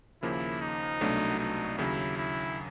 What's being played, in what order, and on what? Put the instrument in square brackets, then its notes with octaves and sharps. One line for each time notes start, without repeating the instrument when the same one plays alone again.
[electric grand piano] D#2 C#3 F3 A#3 [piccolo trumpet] E4
[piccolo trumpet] D#4
[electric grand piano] C2 B2 F#3 A3 D4
[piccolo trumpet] D#4
[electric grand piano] D#2 C#3 F#3 [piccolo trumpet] E4
[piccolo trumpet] E4